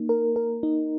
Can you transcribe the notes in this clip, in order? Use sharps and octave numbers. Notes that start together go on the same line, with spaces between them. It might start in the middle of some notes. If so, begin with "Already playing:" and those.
Already playing: A#3 D#4
A#4
A#4
D#4